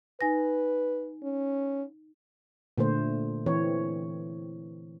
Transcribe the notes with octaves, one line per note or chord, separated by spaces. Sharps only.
D#4 B4 G#5 A#6
C#4
A#2 D3 A3 C5
E3 C4 C#5